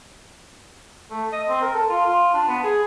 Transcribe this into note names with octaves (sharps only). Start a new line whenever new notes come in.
A3
D#5
C4
A#4
A4
F4
F4
D4
B3
G#4